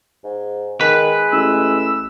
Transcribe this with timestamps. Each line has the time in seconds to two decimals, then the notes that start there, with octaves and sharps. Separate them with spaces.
0.24 G#2
0.81 D#3 G#3 B4
1.32 A1 E6